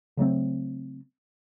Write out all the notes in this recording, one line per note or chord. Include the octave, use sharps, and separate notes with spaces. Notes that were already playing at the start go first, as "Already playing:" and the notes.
C#3 F#3 A3 C4